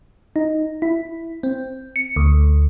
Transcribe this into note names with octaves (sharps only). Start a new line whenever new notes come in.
D#4
E4
C4
C#7
D2